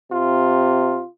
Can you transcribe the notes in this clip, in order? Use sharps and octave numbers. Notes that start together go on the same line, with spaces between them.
C3 F4